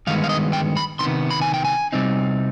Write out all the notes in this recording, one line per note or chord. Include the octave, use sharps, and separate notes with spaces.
G2 D#3 G#3 B3 F5
F5
D#5
G5
B5
C3 D#3 B3 C6
B5
G#5
G5
G#5
C3 G3 C4 D#4